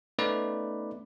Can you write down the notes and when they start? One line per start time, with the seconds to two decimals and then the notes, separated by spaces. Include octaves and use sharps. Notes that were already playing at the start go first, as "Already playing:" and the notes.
0.19 A3 B3 C#4 D#4 B4 D5